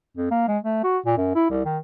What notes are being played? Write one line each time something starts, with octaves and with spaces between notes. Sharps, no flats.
F2
A#3
G#3
A3
F#4
A#2
F#2
E4
C2
D#3